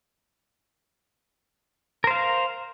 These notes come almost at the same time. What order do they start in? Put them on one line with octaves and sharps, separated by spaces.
A#4 C5 F5